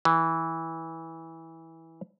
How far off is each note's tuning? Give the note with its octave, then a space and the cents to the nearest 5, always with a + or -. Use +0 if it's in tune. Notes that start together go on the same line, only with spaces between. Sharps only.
E3 -15